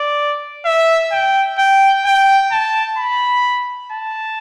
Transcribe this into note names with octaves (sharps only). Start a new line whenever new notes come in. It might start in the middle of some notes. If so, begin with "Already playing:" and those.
Already playing: D5
E5
G5
G5
G5
A5
B5
A5